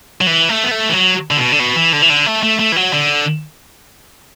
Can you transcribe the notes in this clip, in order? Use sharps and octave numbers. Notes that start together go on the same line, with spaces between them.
F#3
E3
A3
B3
A3
E3
F#3
D3
B2
D3
B2
E3
D3
E3
D3
A3
A3
A3
E3
F#3
D3